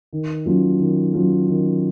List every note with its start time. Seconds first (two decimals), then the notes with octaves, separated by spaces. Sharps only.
0.13 D#3
0.46 F#3 C#4 F4
0.80 D#3
1.14 F#3 C#4 F4
1.49 D#3